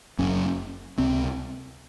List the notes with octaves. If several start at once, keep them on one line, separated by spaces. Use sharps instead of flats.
F#1 F#2 C#3 C#4
C#2 C3 C4